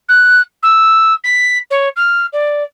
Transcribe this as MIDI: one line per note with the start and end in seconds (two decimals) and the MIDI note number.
0.08 0.41 90
0.62 1.13 88
1.24 1.58 95
1.70 1.88 73
1.96 2.26 89
2.32 2.63 74